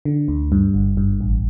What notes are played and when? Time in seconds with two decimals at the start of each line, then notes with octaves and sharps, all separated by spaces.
0.05 D3
0.28 D2
0.52 G2
0.74 G1
0.97 G2
1.21 A1